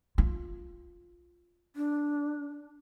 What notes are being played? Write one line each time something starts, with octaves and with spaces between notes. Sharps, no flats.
F4
D4